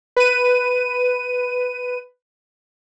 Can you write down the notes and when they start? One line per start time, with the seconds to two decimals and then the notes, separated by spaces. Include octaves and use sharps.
0.17 B4 D#7